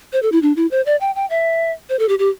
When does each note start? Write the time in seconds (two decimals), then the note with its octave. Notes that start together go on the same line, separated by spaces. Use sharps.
0.13 C5
0.23 A4
0.32 E4
0.42 D4
0.56 E4
0.71 C5
0.86 D5
1.01 G5
1.15 G5
1.30 E5
1.89 C5
1.99 A4
2.09 G4
2.19 G4